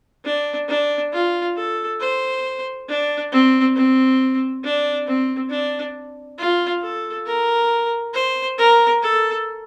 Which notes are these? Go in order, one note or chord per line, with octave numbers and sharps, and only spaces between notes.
D4
D4
F4
A4
C5
D4
C4
C4
D4
C4
D4
F4
A4
A#4
C5
A#4
A4